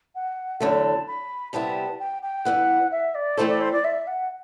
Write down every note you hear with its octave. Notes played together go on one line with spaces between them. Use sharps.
F#5
E2 D3 F#3 A3 A5
B5
C3 G3 B3 E4 G4 A5
G5
G5
G2 E3 B3 F#5
E5
D5
E3 A3 C4 E4 A4 C5
D5
C5
D5
E5
F#5